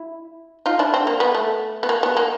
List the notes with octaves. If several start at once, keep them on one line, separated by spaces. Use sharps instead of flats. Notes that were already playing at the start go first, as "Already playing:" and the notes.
Already playing: E4
D#4 F4
D4 E4
C4
A#3
B3
A3
B3
A#3
B3
A#3